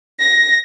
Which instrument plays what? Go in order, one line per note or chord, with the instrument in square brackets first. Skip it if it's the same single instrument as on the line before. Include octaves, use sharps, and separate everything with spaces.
[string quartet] A#6